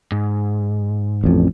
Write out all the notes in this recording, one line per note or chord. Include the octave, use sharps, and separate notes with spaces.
G#2
A1 F2